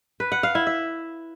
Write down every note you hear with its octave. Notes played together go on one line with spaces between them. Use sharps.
B4
F#5
F5
E4
E5